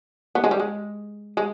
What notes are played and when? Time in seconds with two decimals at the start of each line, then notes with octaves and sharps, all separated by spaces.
0.35 B3
0.44 G#3
0.51 G3
0.60 G#3
1.37 G#3